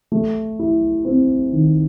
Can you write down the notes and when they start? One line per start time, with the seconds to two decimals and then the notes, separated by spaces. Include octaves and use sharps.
0.12 A3
0.59 E4
1.05 C4
1.52 D#3